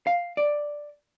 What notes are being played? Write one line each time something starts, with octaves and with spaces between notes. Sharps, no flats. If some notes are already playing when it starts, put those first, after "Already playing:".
F5
D5